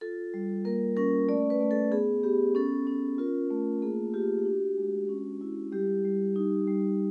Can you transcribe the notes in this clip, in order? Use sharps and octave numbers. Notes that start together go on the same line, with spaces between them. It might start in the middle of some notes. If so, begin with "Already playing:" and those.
F4 A4
G3
A#3 A#4
C#4 A#4
A3 D5
B4
A3
A4
B3 G#4
B3 G4
C#4 A4
C#4
F4 A#4
A3
A#3 G#4
F4 G4
G4
D4 F#4
G#3
C#4
E4
G3 G4
G3
D#4
G3